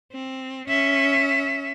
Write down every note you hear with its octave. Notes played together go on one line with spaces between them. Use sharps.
C4
C#4 E5